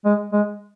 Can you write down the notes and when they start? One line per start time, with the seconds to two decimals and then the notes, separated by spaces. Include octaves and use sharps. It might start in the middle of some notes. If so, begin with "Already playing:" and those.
0.05 G#3
0.33 G#3